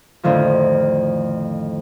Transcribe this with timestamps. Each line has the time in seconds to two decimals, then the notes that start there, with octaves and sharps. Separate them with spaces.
0.23 F2 A2 D3 D#3 F3